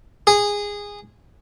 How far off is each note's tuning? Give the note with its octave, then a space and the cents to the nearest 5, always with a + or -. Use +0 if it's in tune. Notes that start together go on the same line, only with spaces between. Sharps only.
G#4 -15